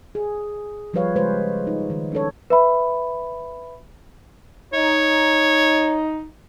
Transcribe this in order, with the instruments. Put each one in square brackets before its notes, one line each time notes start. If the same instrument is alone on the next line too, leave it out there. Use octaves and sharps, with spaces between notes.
[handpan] G#4
F3 G3 G4 B4 C#5 F5
C#3 G#3 G#4 B4 C5
D#4
D#3
C#4 D4 A4 C#5
[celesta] B4 E5 B5
[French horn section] D#4 [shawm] C#5